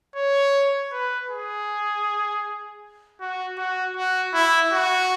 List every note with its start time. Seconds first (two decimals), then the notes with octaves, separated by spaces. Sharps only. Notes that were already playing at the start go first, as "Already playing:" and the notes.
0.16 C#5
0.92 B4
1.30 G#4
3.21 F#4
3.58 F#4
3.96 F#4
4.34 E4
4.73 F#4